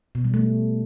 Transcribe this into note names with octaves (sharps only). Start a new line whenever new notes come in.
B2
G3
A3